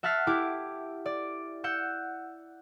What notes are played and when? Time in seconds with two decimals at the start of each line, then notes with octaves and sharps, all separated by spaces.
0.03 E5 F#5 A5 F6 B6 C7
0.27 E4 G4 D6
1.06 D5
1.64 F#5 E6 G6 C#7